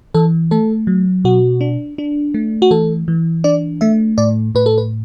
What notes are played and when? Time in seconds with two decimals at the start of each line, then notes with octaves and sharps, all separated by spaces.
0.14 E3 A4
0.51 A3 A4
0.87 F#3
1.24 B2 F#4
1.61 D4
1.98 D4
2.34 A3
2.62 F#4
2.71 E3 A4
3.08 E3
3.44 D4 D5
3.81 A3 E5
4.18 A2 D5
4.55 A2 B4
4.66 A4
4.78 B4